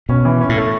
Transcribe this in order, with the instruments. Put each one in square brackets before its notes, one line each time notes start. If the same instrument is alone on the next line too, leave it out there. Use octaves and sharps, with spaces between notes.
[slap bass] B2 [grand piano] C#4
[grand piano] E3
C#4
[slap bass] A2
[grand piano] A3